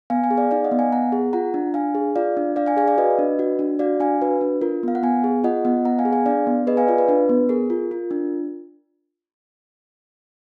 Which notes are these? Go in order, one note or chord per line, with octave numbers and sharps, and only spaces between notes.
B3 F5 G#5
F5 G#5
G#4
D5 F5
D#4 D5 F5
D#5 F#5
B3
F5 G#5
B3 F#5 A#5
G#4
F4 F#5 A#5
D4
D4 F5 G#5
G#4
F4 D5 F5
D4
D4 D5 F5
F5 G#5
G#4 F5 G#5
D5 F5
F#4 B4 D#5
D4
F#4
D4
F#4 D5 F5
D4 F5 G#5
F#4 B4
D4
F4 A#4
B3 F5
F#5
B3 F5 G#5
G#4
F4 D#5 F#5
B3 D#5 F#5
B3 F#5 A#5
F5 G#5
G#4
F5 G#5
D4 D5 F5
B3
G#4 B4 D#5
F5 G#5
F4 D5 F5
B4
D4 B4
B3
G#4 A#4
F4
F4
D4